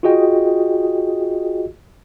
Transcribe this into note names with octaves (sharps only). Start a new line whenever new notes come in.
F4 F#4 G#4 D#5 G5